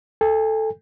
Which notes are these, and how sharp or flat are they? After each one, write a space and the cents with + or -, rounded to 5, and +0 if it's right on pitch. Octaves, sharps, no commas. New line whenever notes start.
A4 +0 G#5 -45